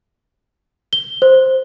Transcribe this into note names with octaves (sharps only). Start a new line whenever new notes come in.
G7
C5